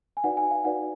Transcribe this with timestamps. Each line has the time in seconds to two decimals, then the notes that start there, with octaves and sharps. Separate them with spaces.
0.17 G#5
0.24 D#4 F#4 B4 D5 F#5
0.37 G#5
0.51 F5
0.65 D#4 F#4 B4 D5 F#5